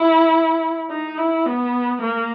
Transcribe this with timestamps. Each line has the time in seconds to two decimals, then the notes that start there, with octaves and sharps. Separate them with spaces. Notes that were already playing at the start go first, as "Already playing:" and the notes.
Already playing: E4
0.90 D#4
1.18 E4
1.46 B3
2.02 A#3